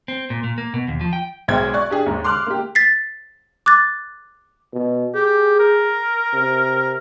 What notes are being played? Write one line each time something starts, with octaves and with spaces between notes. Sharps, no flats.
C4
A#2
A#2
A#3
B2
D#2
F3
G5
B1 G#3 C5 G5 G#6
D5 C#6 F#6
D4 G4 G#4
D#2 G#2
C6 D6 F6 F#6
A#3 G4
A6 B6 C7
D6 F#6 A6
B2
G4 G#4
A#4
C3